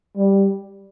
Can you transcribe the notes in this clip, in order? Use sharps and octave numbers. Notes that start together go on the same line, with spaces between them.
G3